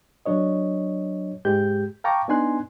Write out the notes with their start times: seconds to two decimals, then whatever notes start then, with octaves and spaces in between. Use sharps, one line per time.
0.26 F#3 D4 C#5 D#5
1.45 G#2 G#3 G4 G6
2.04 F5 G5 A5 A#5 C#6 D6
2.28 B3 D4 D#4 G#5 C6 F#6